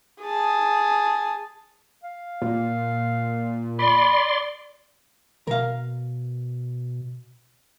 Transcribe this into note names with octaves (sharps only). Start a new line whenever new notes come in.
G#4 A5
F5
A#2
D5 B5 C6
B2 A#4 F5